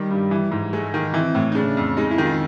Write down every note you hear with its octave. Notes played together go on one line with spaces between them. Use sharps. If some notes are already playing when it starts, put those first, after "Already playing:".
Already playing: D#3 G3
G2
E3
G#2
G#3 A3
D#3 A#3
E3 C4
A2
D#4
C#3 D4
F2
G#3 D#4
E4
D#3
F4